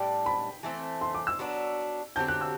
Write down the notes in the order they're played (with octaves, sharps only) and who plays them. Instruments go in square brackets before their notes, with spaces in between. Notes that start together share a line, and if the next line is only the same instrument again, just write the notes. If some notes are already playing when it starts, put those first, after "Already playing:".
Already playing: [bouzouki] A2 G3 D4 [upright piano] G5
[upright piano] B5
[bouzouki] E3 A3 C4
[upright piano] C6
D6
E6
[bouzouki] F#3 B3 D4
[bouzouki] D3 F#3 C4 G4 [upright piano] G6
[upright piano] F#6
E6